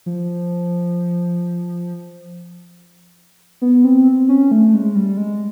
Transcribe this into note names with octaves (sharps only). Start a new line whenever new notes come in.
F3
B3
C4
C#4
A3
G#3
G3
G#3